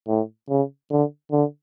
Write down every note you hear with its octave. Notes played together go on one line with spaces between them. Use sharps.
A2
C#3
D3
D3